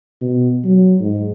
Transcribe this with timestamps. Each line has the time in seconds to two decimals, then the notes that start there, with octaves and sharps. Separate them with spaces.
0.21 B2
0.65 F#3
1.00 G#2